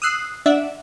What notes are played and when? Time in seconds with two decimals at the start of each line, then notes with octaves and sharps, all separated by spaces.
0.02 D#6 E6 F#6 C7
0.46 D4 D5 E5 F#5